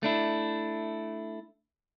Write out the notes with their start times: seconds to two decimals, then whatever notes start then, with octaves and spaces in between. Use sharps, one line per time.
0.03 A3 D4 E4